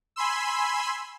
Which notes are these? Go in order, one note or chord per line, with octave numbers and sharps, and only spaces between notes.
G#5 B5 C6 E6